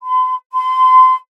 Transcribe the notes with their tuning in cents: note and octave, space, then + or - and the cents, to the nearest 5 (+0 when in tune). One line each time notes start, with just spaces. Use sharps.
C6 -45
C6 -30